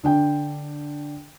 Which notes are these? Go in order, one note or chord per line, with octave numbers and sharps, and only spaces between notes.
D3 D4 G5